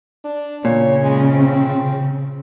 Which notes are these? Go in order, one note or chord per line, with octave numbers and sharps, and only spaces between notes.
D4
A#2 C#3 C#5
G#3
C4